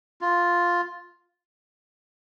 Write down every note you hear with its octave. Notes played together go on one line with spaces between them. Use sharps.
F4